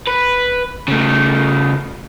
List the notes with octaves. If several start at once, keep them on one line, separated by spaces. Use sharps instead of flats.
B4
C#3 A3